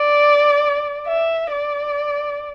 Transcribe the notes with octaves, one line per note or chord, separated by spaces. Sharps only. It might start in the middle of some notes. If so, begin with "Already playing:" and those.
Already playing: D5
E5
D5